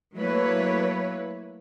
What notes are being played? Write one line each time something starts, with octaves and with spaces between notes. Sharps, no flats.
F#3 A3 A#3 E4 B4 C#5